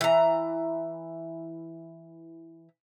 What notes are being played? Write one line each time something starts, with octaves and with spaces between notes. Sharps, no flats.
E3 A#5